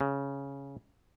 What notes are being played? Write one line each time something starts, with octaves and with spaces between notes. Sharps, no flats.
C#3